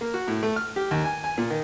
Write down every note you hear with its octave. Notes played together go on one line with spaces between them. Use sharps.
A#3
F#4
A2
A3
F6
G4
D#2
G#5
G#5
A#2
D#3